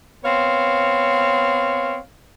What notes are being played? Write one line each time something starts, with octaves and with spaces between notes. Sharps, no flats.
B3 C4 C#5 F5